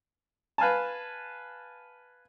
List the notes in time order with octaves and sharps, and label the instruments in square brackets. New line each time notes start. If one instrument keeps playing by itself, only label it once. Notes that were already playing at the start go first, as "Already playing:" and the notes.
[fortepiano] B4 F5 G#5 A5